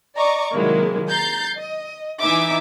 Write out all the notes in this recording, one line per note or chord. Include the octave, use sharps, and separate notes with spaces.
D5 D#5 A#5 C#6 D6
C3 D#3 F#3 G#3 A#3 E4
A#5 G6 A6 C7
D#5
E3 D#4 E5 G#5 D6